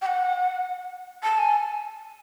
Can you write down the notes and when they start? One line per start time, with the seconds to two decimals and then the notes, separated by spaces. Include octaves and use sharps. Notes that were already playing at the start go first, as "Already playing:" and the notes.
0.01 G5
0.06 F#5
1.23 A5
1.38 G#5